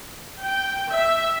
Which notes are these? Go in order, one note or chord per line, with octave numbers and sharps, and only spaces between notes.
G5
E5